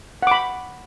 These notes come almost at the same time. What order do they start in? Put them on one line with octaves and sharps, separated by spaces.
F#5 D6 B5